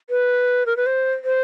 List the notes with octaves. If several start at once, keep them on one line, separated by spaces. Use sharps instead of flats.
B4
A#4
B4
C5
C5